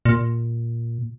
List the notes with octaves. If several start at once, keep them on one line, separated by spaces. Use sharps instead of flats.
A#2